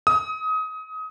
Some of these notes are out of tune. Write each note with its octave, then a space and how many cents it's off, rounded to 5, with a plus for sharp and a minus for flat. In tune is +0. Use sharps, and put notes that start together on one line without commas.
D#6 +25